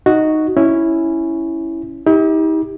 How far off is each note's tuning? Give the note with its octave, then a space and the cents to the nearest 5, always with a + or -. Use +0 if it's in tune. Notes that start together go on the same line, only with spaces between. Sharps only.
D#4 +0 F#4 +0 D#5 +0
C#4 +0 E4 +0
D#4 +45 G4 +15